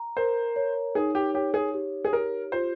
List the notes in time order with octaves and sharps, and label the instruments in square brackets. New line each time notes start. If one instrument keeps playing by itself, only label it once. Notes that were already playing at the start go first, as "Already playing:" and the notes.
Already playing: [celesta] A#5
[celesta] A#4 [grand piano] C5
[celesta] C#5
[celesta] D#4 [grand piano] G#4
[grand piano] G4
[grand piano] G4 [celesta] C#5
[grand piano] G#4
[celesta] G4
[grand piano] G#4
[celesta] G4 [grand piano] A#4
[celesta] F4 [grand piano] C5